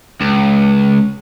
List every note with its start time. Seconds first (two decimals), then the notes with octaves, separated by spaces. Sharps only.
0.21 C#2